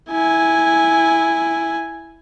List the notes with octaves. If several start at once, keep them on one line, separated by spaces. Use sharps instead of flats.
E4 G#5